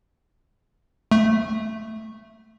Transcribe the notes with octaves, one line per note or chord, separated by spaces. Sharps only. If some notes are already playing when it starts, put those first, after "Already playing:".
A3